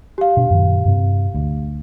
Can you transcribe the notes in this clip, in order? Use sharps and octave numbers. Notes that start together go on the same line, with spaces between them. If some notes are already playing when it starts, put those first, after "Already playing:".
G4 F5
B2 D4
F#2 A#2 D#3
G2 C3 C4
D2